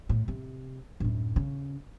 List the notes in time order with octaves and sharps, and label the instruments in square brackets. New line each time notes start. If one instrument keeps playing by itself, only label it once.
[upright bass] A2
C3
D1 F#2
C#3